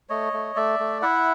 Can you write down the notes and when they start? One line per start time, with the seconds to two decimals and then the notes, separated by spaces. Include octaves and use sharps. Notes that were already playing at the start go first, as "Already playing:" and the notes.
0.09 A3 C#5 D#5
0.33 A3
0.56 A3 D5 E5
0.79 A3
1.02 E4 E5 F#5